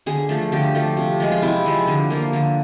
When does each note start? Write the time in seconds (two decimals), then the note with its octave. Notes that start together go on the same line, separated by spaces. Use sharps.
0.06 D3 G#4
0.29 F3 A3
0.52 D3 G4
0.75 F3 A3
0.97 C3
1.20 F3 G#3
1.31 F4
1.42 C3 E4
1.66 F3 G#3
1.87 D3
2.10 F3 A#3
2.33 D3